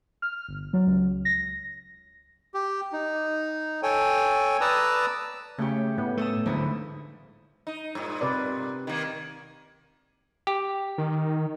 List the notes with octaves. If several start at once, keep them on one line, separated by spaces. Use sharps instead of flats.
F6
G1
F#3
C#2
A#6
G4
D#4
A4 C#5 G5 G#5
B4 D5 A5 A#5 D#6 E6
C#3 A3 C#4 G4
A2 B3 C#4
A3 A5 D#6 E6
D1 G#2 D3 F3 E4 D#6
D#4
G2 A#2
C3 B4 D5
D#3 A#3
G4
D#3